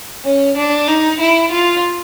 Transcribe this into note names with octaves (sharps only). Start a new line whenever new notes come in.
C#4
D4
D#4
E4
F4